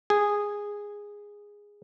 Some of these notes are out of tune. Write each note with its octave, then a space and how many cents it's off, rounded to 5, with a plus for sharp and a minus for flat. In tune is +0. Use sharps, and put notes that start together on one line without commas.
G#4 -10